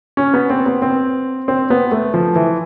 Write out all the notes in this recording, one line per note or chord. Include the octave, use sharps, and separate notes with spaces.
C#4
B3
C4
B3
C4
C4
B3
A3
F3
E3